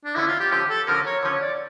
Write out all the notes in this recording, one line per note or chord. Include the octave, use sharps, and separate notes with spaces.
D4
D3 F3 C#4 E4
F4
G4
D3 F3 C#4 G4
A4
D3 F3 C#4 A#4
C#5
D3 F3 C#4 C#5
D5